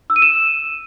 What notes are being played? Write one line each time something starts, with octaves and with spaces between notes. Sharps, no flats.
E6
D#7
E7